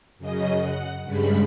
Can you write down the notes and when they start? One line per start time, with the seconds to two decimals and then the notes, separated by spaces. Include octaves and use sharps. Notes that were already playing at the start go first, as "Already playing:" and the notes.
0.18 F#2 C#3 D#5
0.58 F#5
1.04 G2 C#3 G3 G#3 B5